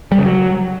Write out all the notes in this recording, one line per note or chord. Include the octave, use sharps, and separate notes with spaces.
G3
C#3
F#3